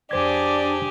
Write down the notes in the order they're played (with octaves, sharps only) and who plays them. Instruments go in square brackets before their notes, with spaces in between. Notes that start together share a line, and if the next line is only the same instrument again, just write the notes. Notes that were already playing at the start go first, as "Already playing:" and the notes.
[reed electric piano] F2 C5 G#6 [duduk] D4 [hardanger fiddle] G4 G#4 [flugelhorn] D5